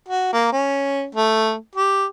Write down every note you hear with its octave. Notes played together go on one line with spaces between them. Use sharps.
F#4
A#3
C#4
A3
G4